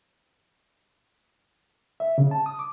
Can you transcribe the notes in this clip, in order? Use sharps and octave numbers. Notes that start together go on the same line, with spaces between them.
E5
C#3
A5
D#6
D6